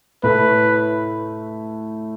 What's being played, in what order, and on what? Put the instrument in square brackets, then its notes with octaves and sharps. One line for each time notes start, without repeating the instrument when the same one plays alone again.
[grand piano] A2 A3 E4 [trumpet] B4